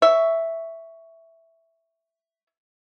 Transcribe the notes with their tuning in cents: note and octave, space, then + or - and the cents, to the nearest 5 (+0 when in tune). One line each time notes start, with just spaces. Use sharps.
C#5 +10 E5 +0